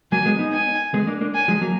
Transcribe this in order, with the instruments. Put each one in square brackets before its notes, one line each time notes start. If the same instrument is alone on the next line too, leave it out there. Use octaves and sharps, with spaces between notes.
[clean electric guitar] F#3 A#3 [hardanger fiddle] G#5
[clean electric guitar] G#3 B3
B3 D#4
[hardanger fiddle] G#5
[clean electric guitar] G#3 B3
A#3 D4
A#3 D4
[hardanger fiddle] G#5
[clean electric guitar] F3 G#3
F#3 A#3